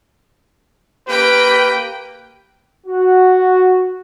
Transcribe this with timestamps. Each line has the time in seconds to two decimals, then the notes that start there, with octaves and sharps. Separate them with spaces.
1.08 A#3 G4 B4 G5
2.87 F#4